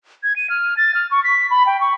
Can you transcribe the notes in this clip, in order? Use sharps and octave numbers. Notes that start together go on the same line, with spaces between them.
G#6
D#7
F6
A6
F6
C#6
B6
B5
G5
C#6